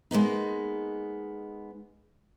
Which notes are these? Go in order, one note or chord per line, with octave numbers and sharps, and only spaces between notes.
G#3 A#3 B3 D#4